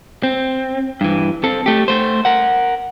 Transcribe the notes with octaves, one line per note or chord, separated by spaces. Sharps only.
C4
G2 E3
C4 A4
A3 G4
A3 C5
A#4 F#5